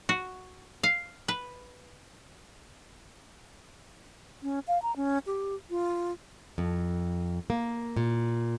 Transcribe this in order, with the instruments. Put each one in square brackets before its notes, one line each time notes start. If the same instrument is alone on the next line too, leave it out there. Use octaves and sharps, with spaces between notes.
[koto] F#4
F5
B4
[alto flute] C#4
F5
A#5
C#4
G4
F4
[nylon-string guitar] F2
A#3
A#2